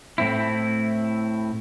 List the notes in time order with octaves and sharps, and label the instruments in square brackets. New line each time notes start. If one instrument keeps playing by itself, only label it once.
[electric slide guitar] A2 C4 E4